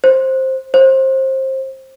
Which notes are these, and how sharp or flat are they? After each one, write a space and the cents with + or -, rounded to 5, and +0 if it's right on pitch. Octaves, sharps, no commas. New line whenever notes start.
C5 +10
C5 +25